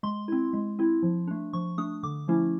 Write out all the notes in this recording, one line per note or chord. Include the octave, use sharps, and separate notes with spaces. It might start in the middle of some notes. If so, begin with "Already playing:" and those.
G#3 C6
C4 E4
G#3
C4 E4
F3
A3 D4
F3 C#6
A3 D4 D#6
D3 D6
F3 A3 C#4 E4